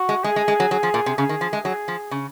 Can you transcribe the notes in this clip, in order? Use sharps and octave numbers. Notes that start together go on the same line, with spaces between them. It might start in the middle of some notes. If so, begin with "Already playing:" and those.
Already playing: F#4
G#3
G#3 G#4
G#3
G#3
F#3
F#3 G#4
F3
A#2
C3
C#3 G#4
D#3
F3
G#3
F#3 G#4
F3
C#3